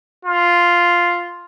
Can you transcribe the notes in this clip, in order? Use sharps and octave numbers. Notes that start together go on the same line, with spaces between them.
F4